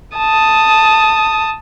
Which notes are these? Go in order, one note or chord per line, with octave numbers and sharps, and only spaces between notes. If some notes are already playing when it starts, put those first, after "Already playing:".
A5 D#6